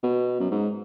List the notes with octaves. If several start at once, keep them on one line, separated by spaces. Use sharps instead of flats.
B2
F#2
G#2